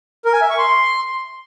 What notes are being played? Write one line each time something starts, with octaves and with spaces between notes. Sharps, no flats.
A#4
G#5
E5
C#6
C6